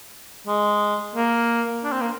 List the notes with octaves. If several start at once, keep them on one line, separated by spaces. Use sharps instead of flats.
G#3
A#3
D4
C4
A#3